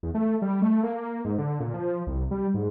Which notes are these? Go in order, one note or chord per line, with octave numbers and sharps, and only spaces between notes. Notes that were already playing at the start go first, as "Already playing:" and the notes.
E2
A3
G3
A3
A#3
G#2
D3
A#2
F3
C2
G3
G#2